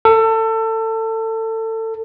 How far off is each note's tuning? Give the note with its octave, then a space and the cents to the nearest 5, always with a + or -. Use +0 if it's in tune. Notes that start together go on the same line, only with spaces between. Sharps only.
A4 +25